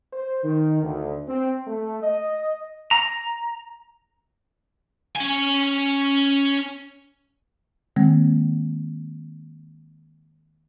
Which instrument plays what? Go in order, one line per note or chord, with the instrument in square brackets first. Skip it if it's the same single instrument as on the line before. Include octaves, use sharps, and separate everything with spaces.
[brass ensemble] C5
D#3
D2
C4
A3
D#5
[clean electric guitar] A#5
[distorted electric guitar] C#4 G#5
[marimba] D#3 G#3 A#3 C4